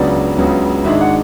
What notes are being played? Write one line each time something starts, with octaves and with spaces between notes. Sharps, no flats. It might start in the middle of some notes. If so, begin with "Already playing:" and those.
Already playing: C#2 C#3 F#3 B3 D4 D5
C#2 C#3 F#3 B3 D4
G#1 G#2 G#3 D4 E5
F#5